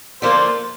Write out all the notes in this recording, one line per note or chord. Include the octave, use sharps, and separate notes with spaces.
D3 F3 A#3 D4 F4 C5